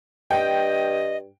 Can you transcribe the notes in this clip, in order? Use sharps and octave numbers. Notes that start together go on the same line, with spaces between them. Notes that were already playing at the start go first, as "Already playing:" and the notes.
G2 D#5 G5